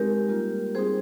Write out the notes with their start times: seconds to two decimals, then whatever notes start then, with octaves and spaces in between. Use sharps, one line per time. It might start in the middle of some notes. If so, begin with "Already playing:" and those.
Already playing: G#3 C4 D#4 G4 A#4
0.28 G3 A#3 F4
0.75 G3 C4 D#4 G#4 C5